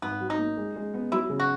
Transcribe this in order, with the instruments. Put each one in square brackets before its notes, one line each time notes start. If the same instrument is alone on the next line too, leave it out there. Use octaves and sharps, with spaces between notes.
[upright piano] G#1 [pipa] B3
[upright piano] F#3
[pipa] D#4
[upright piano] A#3
G#3
G#3
B3
[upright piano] F#3 [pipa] E4
[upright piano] C#3
[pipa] F#4